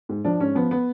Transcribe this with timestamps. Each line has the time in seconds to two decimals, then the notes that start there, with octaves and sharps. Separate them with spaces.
0.09 G#2
0.25 F3 D4
0.40 G#2 C#4
0.55 F3 B3
0.71 B3